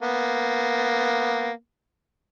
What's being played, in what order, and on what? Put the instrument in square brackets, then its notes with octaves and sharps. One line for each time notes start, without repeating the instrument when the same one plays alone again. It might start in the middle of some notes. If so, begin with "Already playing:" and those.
[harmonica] A#3 B3